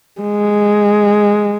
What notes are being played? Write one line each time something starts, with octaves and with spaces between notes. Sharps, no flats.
G#3